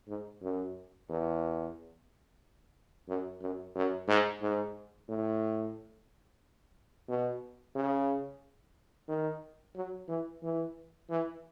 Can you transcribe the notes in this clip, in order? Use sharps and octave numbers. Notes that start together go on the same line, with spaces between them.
G#2
F#2
E2
F#2
F#2
F#2
G#2
G#2
A2
B2
C#3
D#3
F#3
E3
E3
E3